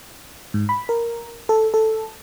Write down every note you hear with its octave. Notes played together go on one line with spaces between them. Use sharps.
G#2
B5
A#4
A4
A4